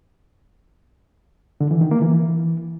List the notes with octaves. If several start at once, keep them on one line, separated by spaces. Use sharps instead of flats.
D3
E3
D#3
A#3
E3